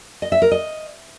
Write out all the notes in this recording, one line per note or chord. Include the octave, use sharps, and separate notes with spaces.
D#5
E5
A#4
D#5